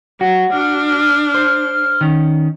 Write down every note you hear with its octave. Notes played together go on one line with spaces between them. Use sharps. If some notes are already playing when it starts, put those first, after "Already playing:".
F#3 F#4
D4 F6
C5
D#3 C#4